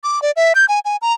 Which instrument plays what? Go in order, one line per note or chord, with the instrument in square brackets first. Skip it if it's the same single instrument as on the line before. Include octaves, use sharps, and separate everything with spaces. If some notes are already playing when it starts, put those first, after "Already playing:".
[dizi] D6
D5
E5
G6
G#5
G#5
A#5